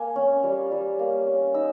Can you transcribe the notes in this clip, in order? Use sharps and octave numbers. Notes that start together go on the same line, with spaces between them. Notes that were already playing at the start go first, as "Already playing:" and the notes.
Already playing: A#3 G#5
C#4
G3
G3
A#3
C#4
D#4 E6